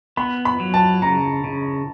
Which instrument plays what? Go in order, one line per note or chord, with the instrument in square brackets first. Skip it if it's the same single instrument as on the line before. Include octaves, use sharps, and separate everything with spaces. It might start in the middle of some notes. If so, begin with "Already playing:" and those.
[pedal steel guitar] B3 [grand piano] B5
[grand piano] B5
[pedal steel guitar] F#3
[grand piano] A5
[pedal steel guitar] C#3 [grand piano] A#5
[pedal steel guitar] C#3